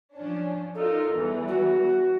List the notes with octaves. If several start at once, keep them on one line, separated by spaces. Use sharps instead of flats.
F3 C#4 D4
D#4 F4 A4 A#4
E2 E3 G3
F#4